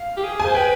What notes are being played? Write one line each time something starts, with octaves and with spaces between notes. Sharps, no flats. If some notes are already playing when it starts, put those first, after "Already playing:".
Already playing: F5
G4
G#4
G#5
C5
B4 G5